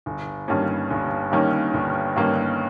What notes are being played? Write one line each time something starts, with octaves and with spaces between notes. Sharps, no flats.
G1
G2 D#3 A#3 C#4
G1
G2 D#3 A#3 C#4
G1
G2 D#3 A#3 C#4